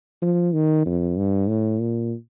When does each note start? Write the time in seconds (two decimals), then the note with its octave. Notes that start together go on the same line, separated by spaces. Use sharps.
0.22 F3
0.53 D#3
0.86 F2
1.17 G2
1.49 A2
1.81 A#2